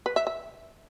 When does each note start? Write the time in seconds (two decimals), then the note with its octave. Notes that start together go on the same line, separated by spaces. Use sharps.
0.06 B4
0.16 E5
0.27 E5